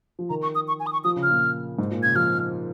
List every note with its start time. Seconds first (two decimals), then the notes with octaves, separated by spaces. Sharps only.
0.19 F3
0.30 D#3 A#5
0.43 C#6
0.55 D#6
0.68 C#6
0.80 G#5
0.87 D#6
0.93 C#6
1.04 F3 D#6
1.16 C#3
1.23 F6
1.30 A#2
1.78 G#2
1.91 A#2
2.03 C#3 G#6
2.16 F3 F6